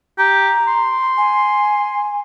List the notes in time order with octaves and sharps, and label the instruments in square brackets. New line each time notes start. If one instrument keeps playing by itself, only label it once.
[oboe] G4 [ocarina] A#5
[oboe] C6
[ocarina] G#5